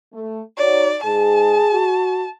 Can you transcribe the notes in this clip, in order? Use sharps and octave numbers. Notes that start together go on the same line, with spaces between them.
A3
D#4 F#4 C#5 D5
G#2 G#4 A5
F#4